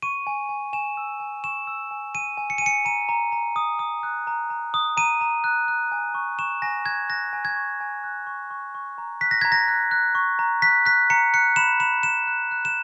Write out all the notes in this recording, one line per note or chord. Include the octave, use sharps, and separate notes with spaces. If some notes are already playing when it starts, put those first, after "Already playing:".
C#6 D#7
G#5
G#5
G#5 E7
E6
G#5
C#6 E7
E6
G#5
G#5 D#7
G#5
C#7
D#7
G#5 C#7
A#5 D#7
A#5
A#5
D#6
D#6
F#6
A#5
A#5
D#6
A#5 D#7
A#5
F#6
F#6
G#5
C#6
C#6 E7
G#5 A#6
F#6 G#6
F#6 A#6
G#5
G#6
C#6
G#5
F#6
C#6
C#6
C#6
A#5
F#6 B6
A#6
A#5 G#6
A#6
F#6
F#6
C#6
A#5
F#6 B6
F#6 B6
A#5 C#7
F#6 C#7
B5 E7
B5 E7
B5 E7
F#6
F#6
E7